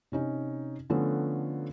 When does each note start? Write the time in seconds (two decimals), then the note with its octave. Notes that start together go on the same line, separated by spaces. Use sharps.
0.12 C3 C#4 D#4
0.90 D3 F3 A3 B3 C#4